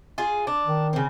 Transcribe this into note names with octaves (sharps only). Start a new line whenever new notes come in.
F4 G#4
D4
D#3
C#3 C4